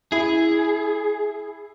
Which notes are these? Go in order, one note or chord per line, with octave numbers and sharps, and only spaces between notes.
E4 G#4